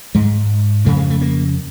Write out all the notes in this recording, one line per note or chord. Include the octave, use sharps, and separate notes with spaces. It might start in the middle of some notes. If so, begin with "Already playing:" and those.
G#2 G#3
F2 C#3 A3
G#3
A3
A#3